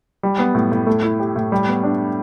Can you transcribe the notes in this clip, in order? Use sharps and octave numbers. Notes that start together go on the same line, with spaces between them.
G3
B3
A2
A2
A3
E4
G4
A2
G3
B3
D4